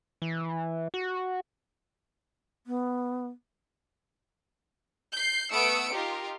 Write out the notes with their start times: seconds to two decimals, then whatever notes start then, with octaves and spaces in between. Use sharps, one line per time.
0.22 E3
0.94 F#4
2.67 B3
5.14 G6 C7
5.52 A3 B3 D#6 E6 C#7 D7
5.93 D#4 F4 G4 A#4